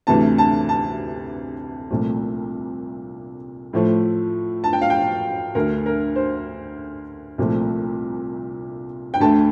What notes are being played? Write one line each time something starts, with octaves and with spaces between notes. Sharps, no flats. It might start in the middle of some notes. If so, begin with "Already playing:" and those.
D2 C3 E3 A3 A5
A5
A5
C2 A#2 F3 A3
A2 F3 A3
A5
G5
F5
G5
D2 D3 A3 A#4
A#4
C5
C2 A#2 F3 A3
G5
D2 D3 A3 A5